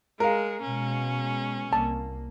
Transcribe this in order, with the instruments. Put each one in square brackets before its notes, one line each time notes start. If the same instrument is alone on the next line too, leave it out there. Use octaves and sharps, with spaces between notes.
[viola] G#3 [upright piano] A#4 F5
[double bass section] B2 G#3 [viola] C#4
[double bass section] C2 A#3 [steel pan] A5